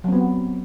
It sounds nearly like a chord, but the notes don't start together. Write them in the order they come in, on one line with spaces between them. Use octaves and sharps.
F#3 C4 B3